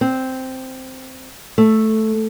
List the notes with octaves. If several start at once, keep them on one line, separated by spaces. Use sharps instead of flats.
C4
A3